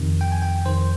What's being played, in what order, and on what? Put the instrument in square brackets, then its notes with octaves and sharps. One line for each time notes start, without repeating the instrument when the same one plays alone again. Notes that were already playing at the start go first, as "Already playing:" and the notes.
Already playing: [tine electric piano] F2 C3 D#3
G5
G#5
G5
F2 C3 D#3 C5